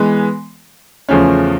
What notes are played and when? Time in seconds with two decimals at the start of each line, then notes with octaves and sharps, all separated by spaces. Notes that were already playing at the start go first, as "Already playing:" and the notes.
Already playing: E3 G#3 B3
1.09 E2 C#3 F3 A3 C#4